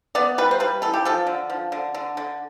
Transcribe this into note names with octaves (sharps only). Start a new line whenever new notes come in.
B3 D5
G3 B4
C5
G3 B4
E3 A4
G4
F3 A4
D3
F3
D3
D3
D3